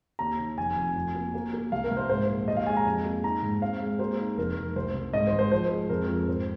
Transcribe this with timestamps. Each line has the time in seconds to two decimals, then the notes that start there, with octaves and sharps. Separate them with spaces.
0.19 D#2 A#5
0.39 D#3
0.58 F1 G#5
0.76 F2
0.96 F2
1.15 A#3
1.34 A#3
1.53 A#3
1.72 C2 F5
1.84 A#4
1.91 C2
1.97 C5
2.09 G#2 C5
2.29 A#1
2.48 D#2 D#5
2.57 F5
2.66 G#3 G#5
2.77 A#5
2.86 F2
3.05 A#3
3.24 D#4 A#5
3.42 G#2
3.62 C4 F5
3.80 G#3
3.99 A#3 C5
4.19 D#4
4.37 F1 A#4
4.57 F1
4.76 C2 C5
4.94 C2
5.13 G#2 D#5
5.27 C5
5.32 G#1
5.39 C5
5.52 F3 C5
5.71 G#3
5.89 F2 A#4
6.09 F2
6.28 G#2 C5